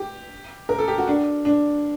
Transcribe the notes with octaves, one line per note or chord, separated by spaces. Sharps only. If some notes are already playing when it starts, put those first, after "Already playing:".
Already playing: G4
A#4
A4
G4
F#4
D4
D4